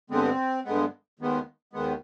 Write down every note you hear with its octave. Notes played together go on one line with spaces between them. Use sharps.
G2 D3 G#3 B3 C4
G2 D3 G#3 B3
D#2 D#3 G#3 B3
D#2 D#3 G#3 B3